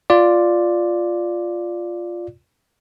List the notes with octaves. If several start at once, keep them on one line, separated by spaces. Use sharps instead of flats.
F4 D5